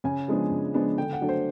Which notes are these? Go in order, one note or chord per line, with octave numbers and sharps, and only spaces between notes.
C#3 G#5
F3 G#3 B3 D4
C#3
F3 G#3 B3 D4
D3 G5
F#5
F#3 A3 D4
C5